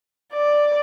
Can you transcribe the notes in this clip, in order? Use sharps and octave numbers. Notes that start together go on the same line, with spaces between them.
D5